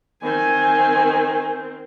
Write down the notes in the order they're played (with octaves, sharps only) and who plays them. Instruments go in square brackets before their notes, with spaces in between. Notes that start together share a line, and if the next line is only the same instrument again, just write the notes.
[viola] D#3 C4 [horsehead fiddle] G#5